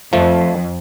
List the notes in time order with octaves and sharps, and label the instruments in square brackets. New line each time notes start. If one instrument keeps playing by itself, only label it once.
[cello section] F2 [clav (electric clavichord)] F3 A3